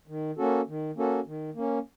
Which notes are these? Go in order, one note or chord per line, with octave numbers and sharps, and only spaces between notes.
D#3
A#3 C#4 F#4 A4
D#3
A#3 C#4 F#4 A4
D#3
A#3 C#4